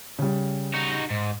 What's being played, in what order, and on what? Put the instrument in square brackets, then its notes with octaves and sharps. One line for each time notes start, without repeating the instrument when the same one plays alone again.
[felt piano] C#3 G3
[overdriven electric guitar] D#4 F#4
G#2